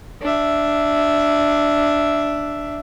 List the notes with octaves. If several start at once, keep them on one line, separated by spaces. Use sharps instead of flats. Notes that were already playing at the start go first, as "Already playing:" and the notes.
D4 E5